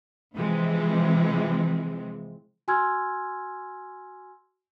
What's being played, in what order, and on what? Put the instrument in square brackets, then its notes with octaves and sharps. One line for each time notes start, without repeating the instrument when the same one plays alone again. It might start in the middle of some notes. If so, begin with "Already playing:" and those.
[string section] C3 E3 F3 G#3 C4
[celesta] F#4 G#5 C6 E6 F6 G#6